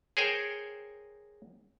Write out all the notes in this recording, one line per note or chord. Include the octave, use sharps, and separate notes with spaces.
G#4 A#4 C5 C#5 G5 G#5